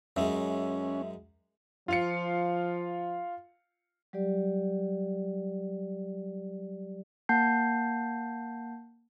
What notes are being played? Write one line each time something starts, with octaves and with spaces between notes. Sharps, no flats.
F#2 G#3 C#4 E5
F3 F4 F5 C#7
F#3 G3 G4 D5
A#3 F#5 A5 G6 C7